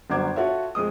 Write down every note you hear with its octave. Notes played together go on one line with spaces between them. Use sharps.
G1 F#2 F#4 C5 D6 G#6
F4 F#4 A4 C#5 E5
F2 G#3 D#6